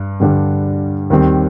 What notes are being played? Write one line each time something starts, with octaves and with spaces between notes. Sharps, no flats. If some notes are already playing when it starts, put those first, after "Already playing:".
Already playing: G2
G2 D3 G3
D#2 D#3 G3 C4